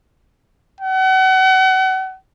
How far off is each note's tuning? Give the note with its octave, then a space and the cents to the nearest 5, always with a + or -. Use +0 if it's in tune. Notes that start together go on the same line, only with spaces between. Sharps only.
F#5 +35